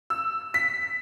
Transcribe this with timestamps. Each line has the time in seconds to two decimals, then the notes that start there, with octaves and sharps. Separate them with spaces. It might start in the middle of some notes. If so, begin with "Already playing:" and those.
0.10 E6
0.54 B6